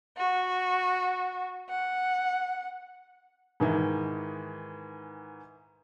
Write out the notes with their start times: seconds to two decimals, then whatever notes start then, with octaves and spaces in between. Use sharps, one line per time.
0.16 F#4
1.69 F#5
3.60 G#2 D#3 E3